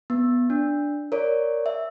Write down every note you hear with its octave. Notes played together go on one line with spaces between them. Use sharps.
B3
D4
A#4 C#5 D5
E5